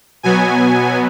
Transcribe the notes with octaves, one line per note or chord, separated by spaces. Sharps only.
B2 F#3 B3 G#5